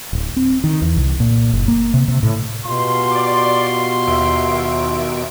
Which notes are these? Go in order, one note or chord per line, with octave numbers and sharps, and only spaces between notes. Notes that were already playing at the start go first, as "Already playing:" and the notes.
D1
C4
D#3
E2
C2
A#2
F#1
A#3
C3
C3
A2
B2 F4 G4 C6
D5 D6
D#2 E5 D7